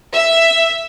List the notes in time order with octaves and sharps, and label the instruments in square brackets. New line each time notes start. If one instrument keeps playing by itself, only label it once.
[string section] E5